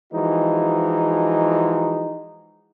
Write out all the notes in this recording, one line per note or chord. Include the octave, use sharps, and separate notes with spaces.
E3 F3 G#3 D#4 F#4